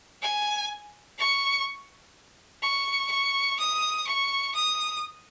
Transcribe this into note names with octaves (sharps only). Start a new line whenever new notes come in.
G#5
C#6
C#6
C#6
D#6
C#6
D#6